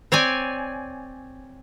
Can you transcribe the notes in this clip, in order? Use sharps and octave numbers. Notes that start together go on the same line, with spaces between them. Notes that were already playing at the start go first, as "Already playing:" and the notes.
C4 C#5 D5 G#5